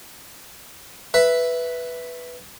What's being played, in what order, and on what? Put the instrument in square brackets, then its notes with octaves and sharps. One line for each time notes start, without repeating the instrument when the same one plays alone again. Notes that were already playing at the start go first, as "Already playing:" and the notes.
[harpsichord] B4 E5